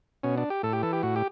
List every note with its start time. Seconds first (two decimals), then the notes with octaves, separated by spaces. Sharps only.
0.23 B2 C#4
0.38 D4
0.50 G4
0.63 A2 A4
0.73 G4
0.83 E3 A4
0.93 G4
1.03 A2 F#4
1.16 G4